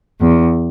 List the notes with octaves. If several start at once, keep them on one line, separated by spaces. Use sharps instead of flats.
E2